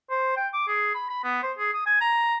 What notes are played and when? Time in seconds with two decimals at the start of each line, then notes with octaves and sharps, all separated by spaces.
0.10 C5
0.37 G5
0.53 D6
0.68 G#4
0.95 B5
1.09 B5
1.24 B3
1.43 C5
1.58 G#4
1.73 D#6
1.86 G#5
2.01 A#5